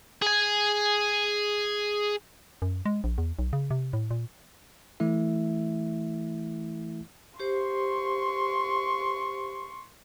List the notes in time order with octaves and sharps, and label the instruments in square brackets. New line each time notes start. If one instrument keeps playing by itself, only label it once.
[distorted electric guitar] G#4 G#5
[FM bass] F#2
G#3
A#1
E2
B1
C#3
C3
A2
A#2
[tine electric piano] E3 A3 E4 E5
[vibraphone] G4 C5 [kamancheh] C6 C#6